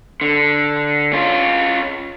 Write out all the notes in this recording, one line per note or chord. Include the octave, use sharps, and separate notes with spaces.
D3
C#4 F4